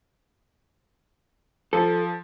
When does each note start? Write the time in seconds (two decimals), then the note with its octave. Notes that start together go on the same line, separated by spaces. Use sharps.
1.73 F3 A4